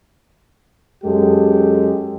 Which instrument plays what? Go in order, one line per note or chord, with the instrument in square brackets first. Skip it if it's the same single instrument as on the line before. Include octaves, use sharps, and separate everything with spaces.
[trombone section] F#2 G#3 G4 A4